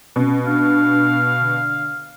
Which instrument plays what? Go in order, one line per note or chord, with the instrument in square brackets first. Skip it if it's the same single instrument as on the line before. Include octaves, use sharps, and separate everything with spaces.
[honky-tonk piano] B2 [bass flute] C#4
[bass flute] D4 [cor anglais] F5
[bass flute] D3